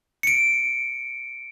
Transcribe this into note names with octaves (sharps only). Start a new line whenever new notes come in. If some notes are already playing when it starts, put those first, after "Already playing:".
C#7 D7